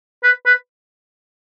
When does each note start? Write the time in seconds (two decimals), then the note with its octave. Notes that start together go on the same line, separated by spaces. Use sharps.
0.23 B4
0.46 B4